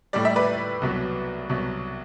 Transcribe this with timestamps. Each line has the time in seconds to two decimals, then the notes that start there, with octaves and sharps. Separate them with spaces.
0.13 A2 G3 D5
0.25 E5
0.36 B4 D5
0.81 C2 B2 F#3
1.49 C2 B2 F#3